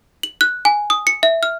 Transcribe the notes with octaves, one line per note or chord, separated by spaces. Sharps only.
F#7
F#6
G#5
D#6
C#7
E5
F6